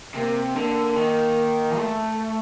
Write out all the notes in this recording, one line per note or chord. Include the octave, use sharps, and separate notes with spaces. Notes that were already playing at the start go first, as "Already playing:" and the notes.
C3 A#3
D3 A#3
D#3
A3